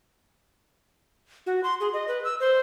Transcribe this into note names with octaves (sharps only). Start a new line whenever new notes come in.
F#4
C6
G#4
D#5
B4
E6
C5